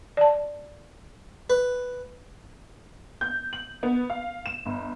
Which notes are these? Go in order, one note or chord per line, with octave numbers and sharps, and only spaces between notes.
D5 A5
B4
G6
F#7
B3
F5
E7
G1